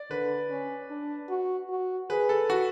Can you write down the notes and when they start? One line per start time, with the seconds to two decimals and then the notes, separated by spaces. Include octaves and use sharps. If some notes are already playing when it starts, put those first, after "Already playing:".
Already playing: D5
0.10 D3 B4
0.50 C#4
0.90 D4
1.29 F#4
1.70 F#4
2.10 G#4 B4
2.29 A4
2.50 F#4